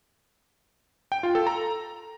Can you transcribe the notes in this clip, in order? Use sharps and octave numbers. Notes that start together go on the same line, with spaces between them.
G5
F4
A4
A#5